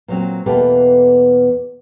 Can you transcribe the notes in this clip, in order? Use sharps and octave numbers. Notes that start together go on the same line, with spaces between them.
A#2 F#3 C4
E2 B2 A#3 G4 A4 B4